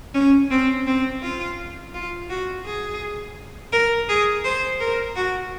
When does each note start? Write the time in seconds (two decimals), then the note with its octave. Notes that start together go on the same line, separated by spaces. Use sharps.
0.14 C#4
0.51 C4
0.87 C4
1.22 F4
1.94 F4
2.29 F#4
2.66 G#4
3.73 A#4
4.08 G#4
4.45 C5
4.80 A#4
5.16 F#4